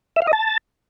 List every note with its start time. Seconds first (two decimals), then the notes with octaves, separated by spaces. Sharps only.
0.16 E5
0.22 F5
0.27 D#5
0.33 A5